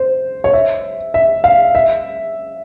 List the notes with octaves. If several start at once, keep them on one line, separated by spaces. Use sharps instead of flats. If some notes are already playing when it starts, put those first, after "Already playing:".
Already playing: C5
C#5
E5
E5
F5
E5